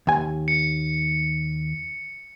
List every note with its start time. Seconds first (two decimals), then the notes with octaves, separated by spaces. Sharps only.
0.07 D#2 G#5
0.48 C#7